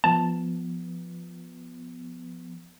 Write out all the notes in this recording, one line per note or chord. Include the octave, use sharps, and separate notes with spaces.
F3 B3 A5